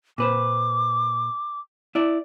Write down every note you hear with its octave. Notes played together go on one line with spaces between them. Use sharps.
A#2 B4 C5 D6
E4 D5